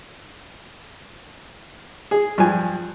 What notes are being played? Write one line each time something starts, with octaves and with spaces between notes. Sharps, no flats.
G#4
G2 F3 G#5